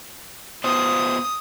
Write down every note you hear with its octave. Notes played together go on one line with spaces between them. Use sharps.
B3 F4 C5 D#6